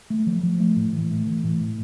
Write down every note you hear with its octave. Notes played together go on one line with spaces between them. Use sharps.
A3
F3
F3
A3
A2
E3
A3
E3
A2
A3